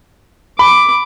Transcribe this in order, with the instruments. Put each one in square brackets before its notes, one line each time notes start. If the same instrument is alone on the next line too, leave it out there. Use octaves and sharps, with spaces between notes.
[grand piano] B5 [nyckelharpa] D6